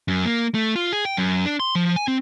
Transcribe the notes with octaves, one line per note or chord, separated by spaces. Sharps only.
F#2
A#3
A3
F4
G#4
G5
F#2
D4
C6
F3
G#5
C4